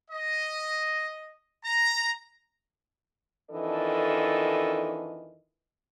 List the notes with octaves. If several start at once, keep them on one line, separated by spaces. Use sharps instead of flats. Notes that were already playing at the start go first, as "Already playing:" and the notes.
D#5
A#5
F2 D#3 E3 D4 A4 D#5